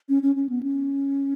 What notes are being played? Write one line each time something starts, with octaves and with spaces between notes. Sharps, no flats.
C#4
C#4
C#4
B3
C#4